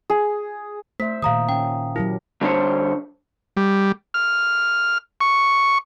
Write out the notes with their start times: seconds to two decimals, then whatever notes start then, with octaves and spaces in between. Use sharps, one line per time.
0.10 G#4
1.00 A3 C5 E5 B6
1.22 A#2 D#3 F5 A#5 D#6
1.49 C#4 G5
1.96 F#3 E4 G4 A#4
2.41 D3 G3 D4 C5 C#5
3.57 G3
4.14 F6
5.21 C#6